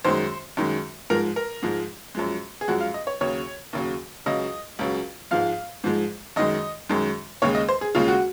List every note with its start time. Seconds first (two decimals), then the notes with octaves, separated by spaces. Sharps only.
0.04 F#2 D#3 G#3 C5
0.57 F#2 D#3 G#3
1.10 G#2 F3 G#3 A#4
1.36 A#4
1.63 G#2 F3 G#3
2.15 F#2 F3 G#3
2.61 G#4
2.68 F#2 F3 G#3 F#4
2.81 F5
2.94 D#5
3.07 C#5
3.21 D#2 C#3 F#3 C#5
3.73 D#2 C#3 F#3
4.26 C#2 C#3 F#3 D#5
4.79 C#2 C#3 F#3
5.31 G#2 F3 G#3 F5
5.84 G#2 F3 G#3
6.36 F#2 D#3 G#3 D#5
6.89 F#2 D#3 G#3
7.42 D#2 C#3 G#3 C#5
7.55 D#5
7.69 C5
7.81 G#4
7.95 D#2 C#3 G#3 F4
8.08 F#4